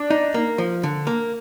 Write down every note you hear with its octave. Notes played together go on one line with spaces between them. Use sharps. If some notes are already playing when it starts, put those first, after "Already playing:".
Already playing: D4
D#4
A#3
F3
D3
A#3